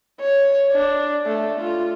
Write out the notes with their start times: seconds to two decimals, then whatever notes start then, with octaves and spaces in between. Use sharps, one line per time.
0.20 C#5
0.71 D4
1.26 A3
1.61 F4